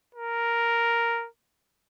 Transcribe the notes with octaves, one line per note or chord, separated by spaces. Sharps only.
A#4